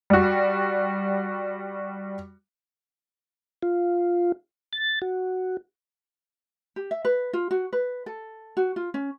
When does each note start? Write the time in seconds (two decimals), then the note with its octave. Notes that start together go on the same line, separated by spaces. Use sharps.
0.10 G3 F#4
3.62 F4
4.73 A6
5.02 F#4
6.76 G4
6.91 E5
7.05 B4
7.33 F4
7.51 F#4
7.73 B4
8.06 A4
8.57 F#4
8.76 F4
8.94 C#4